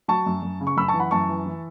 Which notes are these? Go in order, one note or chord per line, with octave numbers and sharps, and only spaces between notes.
F#3 A5 C#6
F#2
F#2
C#3
C#6
F#2 B5 E6
A5 C#6
E3
F#5 B5
F#2 A5 C#6
E3
E3